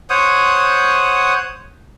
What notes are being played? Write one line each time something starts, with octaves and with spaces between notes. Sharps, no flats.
C5 C#5 F#5 D#6